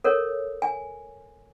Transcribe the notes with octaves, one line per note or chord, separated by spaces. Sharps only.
A4 A#4 C#5
G#5